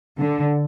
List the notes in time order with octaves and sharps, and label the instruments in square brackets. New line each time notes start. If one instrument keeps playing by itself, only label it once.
[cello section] D3